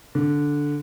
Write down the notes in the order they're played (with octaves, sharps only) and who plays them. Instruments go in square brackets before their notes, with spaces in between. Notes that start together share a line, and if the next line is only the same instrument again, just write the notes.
[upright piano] D3